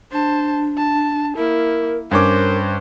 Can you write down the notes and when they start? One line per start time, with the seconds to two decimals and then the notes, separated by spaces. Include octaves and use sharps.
0.12 D4 C5 A5
0.77 A5
1.37 A#3 E4 A#4
2.11 G2 C#4 A#4 C5 D6